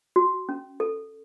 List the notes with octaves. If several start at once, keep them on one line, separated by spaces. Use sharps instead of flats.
F#4
C#4
A4